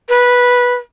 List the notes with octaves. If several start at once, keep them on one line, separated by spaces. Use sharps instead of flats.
B4